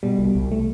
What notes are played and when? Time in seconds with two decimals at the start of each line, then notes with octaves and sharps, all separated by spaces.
0.03 B2 G3
0.19 C2
0.35 C2
0.51 A3